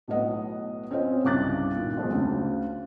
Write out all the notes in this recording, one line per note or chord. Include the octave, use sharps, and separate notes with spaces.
B1 A2 B3 D#5 F#5
C4 C#4 F4 C#5 D#5 G5
C2 G2 C#3 D6 F#6 A6
A#2 D#3
B1 F2 G#3
D2 C#3